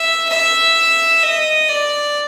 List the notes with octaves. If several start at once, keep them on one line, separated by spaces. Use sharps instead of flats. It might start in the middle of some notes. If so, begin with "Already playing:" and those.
Already playing: E5
E5
D#5
D5